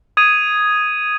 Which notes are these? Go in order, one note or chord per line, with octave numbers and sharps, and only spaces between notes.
D#6 G#6 D#7